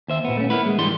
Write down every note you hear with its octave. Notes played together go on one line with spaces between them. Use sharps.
D#2 C5 E5
A#2 B3
A3 C#4
A#3 B3 E4 B4
G#3
G#2 D3 E3 G3 C6